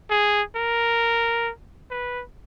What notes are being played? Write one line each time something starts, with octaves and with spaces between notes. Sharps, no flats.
G#4
A#4
B4